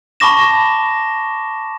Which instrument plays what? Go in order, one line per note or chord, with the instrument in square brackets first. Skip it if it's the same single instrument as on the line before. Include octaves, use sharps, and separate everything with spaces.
[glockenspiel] A5 B5 C#6 D6 A#6 E7